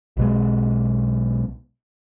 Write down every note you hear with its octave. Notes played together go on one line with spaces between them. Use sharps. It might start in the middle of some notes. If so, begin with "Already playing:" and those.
B1 B2 G#3